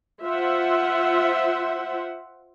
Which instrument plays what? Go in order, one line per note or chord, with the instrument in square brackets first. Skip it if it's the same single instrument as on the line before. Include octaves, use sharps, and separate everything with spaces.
[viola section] F4 C5 E5 F#5